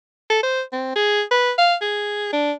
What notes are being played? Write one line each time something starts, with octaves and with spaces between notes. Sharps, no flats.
A4
C5
C4
G#4
B4
F5
G#4
D4